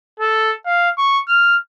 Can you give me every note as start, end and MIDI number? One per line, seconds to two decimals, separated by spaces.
0.20 0.54 69
0.66 0.89 77
0.97 1.19 85
1.28 1.56 89